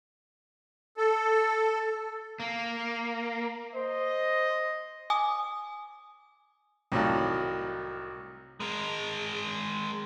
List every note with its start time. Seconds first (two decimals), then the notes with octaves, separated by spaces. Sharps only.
0.97 A4
2.40 A#3
3.74 C5 D#5
5.10 G#5 D6 D#6
6.92 C2 A2 D#3 F#3 F4 A5
8.60 G#3 A#4